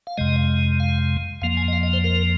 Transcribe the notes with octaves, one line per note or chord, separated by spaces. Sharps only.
F5
F2 C3 G#3 D#5
F5
F2 F3 A#3 F5
G#5
D#5
F5
D#5
C5
A#4